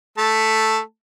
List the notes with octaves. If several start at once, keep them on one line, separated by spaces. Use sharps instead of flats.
A3 A5